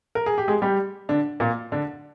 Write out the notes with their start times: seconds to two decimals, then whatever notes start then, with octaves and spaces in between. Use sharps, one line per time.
0.15 A#4
0.26 G#4
0.38 G4
0.48 G#3 G#4
0.62 G3 G4
1.09 D3 D4
1.40 A#2 A#3
1.72 D3 D4